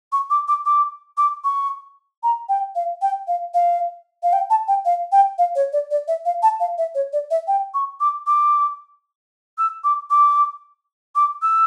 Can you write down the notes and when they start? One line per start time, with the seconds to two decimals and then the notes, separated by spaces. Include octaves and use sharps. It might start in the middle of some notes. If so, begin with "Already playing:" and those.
0.12 C#6
0.30 D6
0.48 D6
0.65 D6
1.17 D6
1.44 C#6
2.23 A#5
2.49 G5
2.75 F5
3.02 G5
3.27 F5
3.54 F5
4.23 F5
4.33 G5
4.50 A5
4.68 G5
4.85 F5
5.12 G5
5.38 F5
5.55 C#5
5.73 D5
5.91 D5
6.08 E5
6.25 F5
6.43 A5
6.60 F5
6.78 E5
6.95 C#5
7.13 D5
7.31 E5
7.47 G5
7.74 C#6
8.00 D6
8.27 D6
9.58 E6
9.84 D6
10.10 D6
11.15 D6
11.42 E6